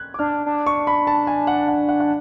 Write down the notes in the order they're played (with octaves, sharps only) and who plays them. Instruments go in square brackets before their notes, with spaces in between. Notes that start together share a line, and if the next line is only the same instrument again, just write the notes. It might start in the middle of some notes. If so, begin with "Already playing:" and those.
Already playing: [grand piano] F#6 G#6
D6
[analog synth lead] D4 [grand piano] F6
[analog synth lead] D4
[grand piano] C#6
B5
A5
G#5
F#5
F#5
F#5
F#5